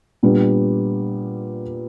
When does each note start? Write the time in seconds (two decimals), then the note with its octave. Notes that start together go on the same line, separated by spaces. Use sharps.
0.23 A#2 G3 B3 D4